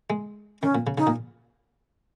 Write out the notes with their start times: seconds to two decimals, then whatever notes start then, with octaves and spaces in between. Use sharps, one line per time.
0.10 G#3
0.62 D#3 C#4
0.75 A#2
0.87 C#3
0.98 C#3 D#4
1.07 A#2